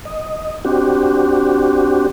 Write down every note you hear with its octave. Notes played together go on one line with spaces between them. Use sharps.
D#5
C4 D4 F#4 G4